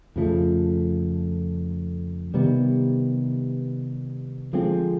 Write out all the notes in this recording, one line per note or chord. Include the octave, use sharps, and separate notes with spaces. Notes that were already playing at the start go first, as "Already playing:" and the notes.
F2 C#3 F3 A3
C3 D#3 G3 B3
D3 F3 G#3 C4